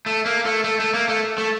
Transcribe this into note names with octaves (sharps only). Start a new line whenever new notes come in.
A3
A#3
A3
A3
A3
A#3
A3
A3